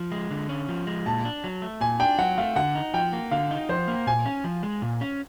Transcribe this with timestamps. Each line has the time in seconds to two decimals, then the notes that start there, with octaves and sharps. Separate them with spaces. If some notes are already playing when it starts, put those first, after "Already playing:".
Already playing: F3
0.12 G#3
0.31 D3
0.49 C#4
0.69 F3
0.87 G#3
1.06 A#2 A5
1.25 D4
1.44 F#3
1.62 A3
1.81 A#2 G#5
2.00 D4 G5
2.19 F#3 F#5
2.38 A3 F5
2.56 D3 F#5
2.75 D#4
2.94 F3 G5
3.13 A#3
3.31 D3 F5
3.51 D#4
3.69 F3 C5
3.88 A#3
4.06 A#2 G#5
4.26 C#4
4.44 F3
4.63 G#3
4.82 A#2
5.01 C#4